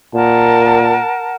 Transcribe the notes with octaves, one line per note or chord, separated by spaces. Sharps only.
A#2 A#4 F#5 A5